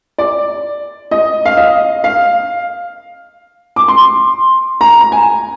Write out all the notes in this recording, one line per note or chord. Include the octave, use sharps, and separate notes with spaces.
D5
D#5
F5
D#5
F5
D6
C6
A#5
A#5
G#5